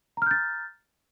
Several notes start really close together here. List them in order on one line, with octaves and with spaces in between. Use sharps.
A#5 F6 G6 A6